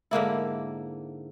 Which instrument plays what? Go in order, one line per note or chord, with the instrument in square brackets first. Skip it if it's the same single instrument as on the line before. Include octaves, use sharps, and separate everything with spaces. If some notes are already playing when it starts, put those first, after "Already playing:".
[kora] G#2 D3 A#3 E4